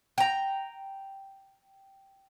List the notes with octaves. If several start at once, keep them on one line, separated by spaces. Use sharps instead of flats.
G5 A#5